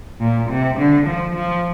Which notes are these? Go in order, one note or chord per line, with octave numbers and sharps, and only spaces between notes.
A#2
C3
D3
F3
F3